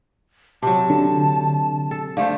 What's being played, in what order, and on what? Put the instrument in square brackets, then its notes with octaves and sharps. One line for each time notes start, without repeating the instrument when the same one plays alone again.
[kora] C3 F#3 [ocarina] A5
[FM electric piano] D3
[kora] A4
[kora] D3 A3 C5 [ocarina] F5